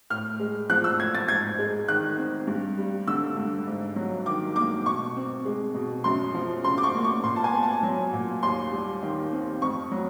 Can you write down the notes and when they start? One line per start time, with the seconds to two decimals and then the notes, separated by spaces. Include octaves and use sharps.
0.10 A2 F6
0.40 G#3
0.69 F3 F#6
0.84 E6
0.99 A2 G#6
1.15 A6
1.28 G#2 G#6
1.58 G#3
1.88 D#3 F#6
2.18 C4
2.47 G2
2.77 G3
3.07 D3 E6
3.37 G2
3.67 G#2
3.96 F#3
4.26 D#3 D6
4.56 A#3 D6
4.86 B2 C#6
5.16 C4
5.45 G#3
5.74 B2
6.04 F#2 C6
6.34 F3
6.64 C#3 C6
6.78 D6
6.83 C#6
6.95 A#3
7.04 C#6
7.24 A#2 C6
7.36 A5
7.44 G#5
7.53 B3
7.63 A5
7.83 F#3
8.13 A#2
8.43 D#2 C6
8.72 G3
9.02 D#3
9.32 C4
9.62 F2 C#6
9.91 F#3